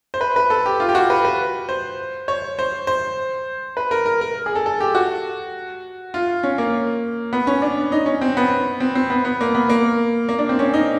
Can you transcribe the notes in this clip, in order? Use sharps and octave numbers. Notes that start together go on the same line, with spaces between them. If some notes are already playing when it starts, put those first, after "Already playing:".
C5
B4
B4
A4
G4
F4
G4
F#4
B4
B4
C5
C#5
C5
C5
B4
A#4
A#4
A#4
G#4
A4
A4
G4
F#4
F4
C#4
A#3
B3
C#4
D4
D#4
C#4
C4
B3
C4
C4
B3
B3
A#3
B3
A#3
A#3
D4
C4
C#4
D#4